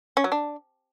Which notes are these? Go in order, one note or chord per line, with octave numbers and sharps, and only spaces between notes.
C#4
F#3
D4